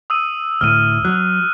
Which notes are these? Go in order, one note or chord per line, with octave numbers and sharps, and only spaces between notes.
D#6 E6 D#7
D2 A2 F6 D#7
F#3 F#6